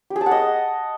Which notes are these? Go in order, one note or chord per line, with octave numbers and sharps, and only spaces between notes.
G4
G#4
A5
F#5
D#5